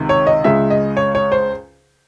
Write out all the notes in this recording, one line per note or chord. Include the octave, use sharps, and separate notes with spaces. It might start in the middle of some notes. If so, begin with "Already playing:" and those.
Already playing: C#2 C3 D#3
C#5
D#5
C#2 C#3 G#3 E5
D#5
C#5
C#5
C5